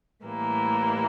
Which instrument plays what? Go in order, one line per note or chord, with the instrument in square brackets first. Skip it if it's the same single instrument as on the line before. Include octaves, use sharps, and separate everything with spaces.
[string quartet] A2 E3 G3 A#3